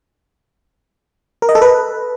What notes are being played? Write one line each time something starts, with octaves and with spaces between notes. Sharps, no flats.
A#4
D#5
A4
B4